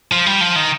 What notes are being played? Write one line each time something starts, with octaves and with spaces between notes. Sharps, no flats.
F3
G3
F3
D#3